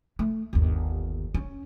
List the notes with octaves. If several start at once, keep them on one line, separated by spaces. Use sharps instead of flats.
A3
G1 D#2
C#4